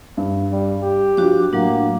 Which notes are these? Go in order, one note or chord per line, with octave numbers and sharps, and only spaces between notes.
G2
G3
G4
F3 F#3 D4 F4 F#4 D6
A2 F#3 A#3 D4